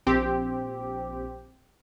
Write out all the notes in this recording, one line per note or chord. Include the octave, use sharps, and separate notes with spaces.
A#1 C4 G4